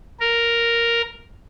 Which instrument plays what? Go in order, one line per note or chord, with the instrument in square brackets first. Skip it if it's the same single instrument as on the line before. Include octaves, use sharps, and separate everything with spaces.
[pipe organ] A#4